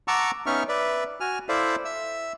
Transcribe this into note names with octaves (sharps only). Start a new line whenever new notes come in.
F#5 A5 A#5 C#6 D6 E6
B3 C#4 D#4 E5 C#6 F6
B4 D5 E5
F#4 G#5 F6
E4 A4 C5 D5 E5 F5
E5 E6